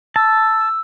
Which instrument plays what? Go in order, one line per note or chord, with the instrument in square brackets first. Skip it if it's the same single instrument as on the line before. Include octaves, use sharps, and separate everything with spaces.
[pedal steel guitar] A5 [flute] E6